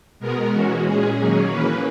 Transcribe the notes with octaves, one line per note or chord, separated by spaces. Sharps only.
B2 G#3 B3 A#4
E3 G#3 C#4 F#4
A#2 G#3 C#4 G#4
D#3 F#3 A#3 C#4
E3 A#3 C#4 B4